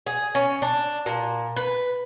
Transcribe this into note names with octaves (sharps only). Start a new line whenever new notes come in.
G#4
C#4
D4
A#2
B4